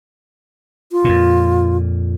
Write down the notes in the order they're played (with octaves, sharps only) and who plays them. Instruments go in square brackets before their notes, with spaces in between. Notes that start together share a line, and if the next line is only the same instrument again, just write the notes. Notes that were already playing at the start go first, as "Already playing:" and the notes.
[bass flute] F4
[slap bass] F2 A#2